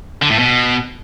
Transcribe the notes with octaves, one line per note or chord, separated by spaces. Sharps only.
D3
A2
B2